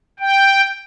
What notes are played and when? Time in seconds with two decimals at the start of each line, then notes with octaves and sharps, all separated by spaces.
0.20 G5